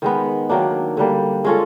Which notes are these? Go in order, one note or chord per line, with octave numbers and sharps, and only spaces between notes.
D#3 G#3 B3
D#3 F#3 A#3 D4
D3 G3 A#3
G#3 C#4 F4 A4